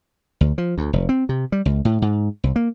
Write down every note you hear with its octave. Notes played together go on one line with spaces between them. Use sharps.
D2
F3
D2
F1
C4
C3
G3
C#2
A2
G#2
C2
A#3